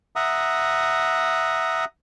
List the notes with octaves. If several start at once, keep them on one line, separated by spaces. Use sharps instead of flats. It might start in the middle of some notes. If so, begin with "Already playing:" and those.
E5 F#5 A#5 D#6